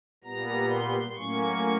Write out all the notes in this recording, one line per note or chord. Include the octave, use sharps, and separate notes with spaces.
A#2 G3 B3 A#5
C6
A2 F#3 A#3 C#4 C#6